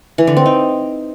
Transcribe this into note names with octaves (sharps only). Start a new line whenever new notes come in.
E3
D3
C4
D#4